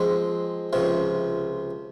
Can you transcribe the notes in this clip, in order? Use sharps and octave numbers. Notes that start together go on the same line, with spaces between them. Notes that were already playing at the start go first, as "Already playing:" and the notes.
Already playing: F3 G#3 C4
C#2 C3 F3